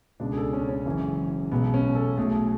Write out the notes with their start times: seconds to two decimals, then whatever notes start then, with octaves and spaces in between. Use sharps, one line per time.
0.20 C#2 B2 G#3 D4
0.32 G#4
0.37 A4
0.53 C#4
0.69 C#4
0.85 F#1 F#2 E3 G#3
1.52 B1 B2 G#3 B3
1.74 C#4
1.95 A4
2.17 B1 B2 F#3 A3 G#4